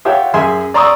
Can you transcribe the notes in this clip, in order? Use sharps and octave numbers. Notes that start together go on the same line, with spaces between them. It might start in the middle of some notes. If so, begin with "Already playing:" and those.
F4 G4 C#5 E5 F#5 G5
F#2 G#4 E5 G#5 C6
D5 A#5 C6 C#6 D#6 E6